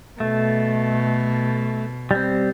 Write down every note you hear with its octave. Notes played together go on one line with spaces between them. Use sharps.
B2 A3
G3 C4